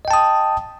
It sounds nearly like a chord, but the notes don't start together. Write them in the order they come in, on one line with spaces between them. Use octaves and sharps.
D#5 G5 A5 D#6